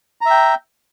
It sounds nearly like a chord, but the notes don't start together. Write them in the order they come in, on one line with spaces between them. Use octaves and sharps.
A#5 E5 G5